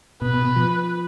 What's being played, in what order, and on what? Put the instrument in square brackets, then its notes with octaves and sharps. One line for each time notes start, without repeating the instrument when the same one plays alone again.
[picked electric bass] B2 [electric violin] B4
[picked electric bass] B2
B2
F3